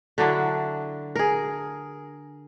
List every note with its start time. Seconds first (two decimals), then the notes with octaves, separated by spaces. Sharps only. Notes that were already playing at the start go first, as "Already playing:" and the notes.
0.18 D3 F#3 D4 E4
1.15 G#4 A#4